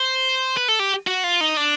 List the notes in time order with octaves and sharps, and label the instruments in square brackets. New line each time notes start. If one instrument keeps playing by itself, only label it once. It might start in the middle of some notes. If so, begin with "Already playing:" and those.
Already playing: [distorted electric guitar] C5
B4
A4
G4
F#4
F4
D#4
D4